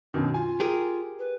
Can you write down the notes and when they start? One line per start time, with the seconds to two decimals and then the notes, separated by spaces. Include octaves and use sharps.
0.14 F#2 B2 D#3 D4
0.34 F4 G#5
0.60 G4 G#4 A#4
1.19 B4